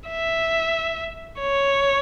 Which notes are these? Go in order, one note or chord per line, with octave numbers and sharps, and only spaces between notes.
E5
C#5